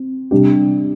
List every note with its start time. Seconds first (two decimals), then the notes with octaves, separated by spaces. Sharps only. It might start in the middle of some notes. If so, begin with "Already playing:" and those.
Already playing: C4
0.31 C3 G3 D4 G4